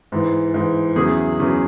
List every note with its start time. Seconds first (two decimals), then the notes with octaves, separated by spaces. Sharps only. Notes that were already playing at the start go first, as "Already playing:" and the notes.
0.12 G#2 E3
0.54 G#2 E3
0.96 E2 C#3 F#3 E4 G#4
1.39 E2 C#3 F#3